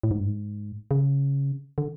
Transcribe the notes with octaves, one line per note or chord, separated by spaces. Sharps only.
A2
G#2
G2
G#2
C#3
D3